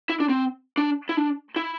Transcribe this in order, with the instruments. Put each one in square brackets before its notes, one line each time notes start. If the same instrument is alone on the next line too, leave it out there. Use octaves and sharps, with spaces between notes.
[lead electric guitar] E4
D4
C4
D4
E4
D4
E4